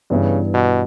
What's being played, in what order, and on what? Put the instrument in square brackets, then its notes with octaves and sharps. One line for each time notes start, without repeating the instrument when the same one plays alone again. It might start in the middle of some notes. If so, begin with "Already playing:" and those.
[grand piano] G2 E3 B3 E4 [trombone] C#3
[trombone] B2